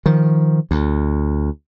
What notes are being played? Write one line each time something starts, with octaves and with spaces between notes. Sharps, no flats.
D#3 F3
D2